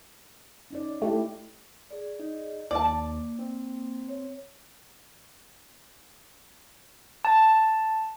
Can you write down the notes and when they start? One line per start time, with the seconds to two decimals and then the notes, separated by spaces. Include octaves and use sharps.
0.70 C#4 D#4 D5
1.02 A3 E4 G4
1.91 G#4 D5
2.19 D#4
2.71 D#2 A#3 D5 A5
3.39 C4
4.08 C#5
7.25 A5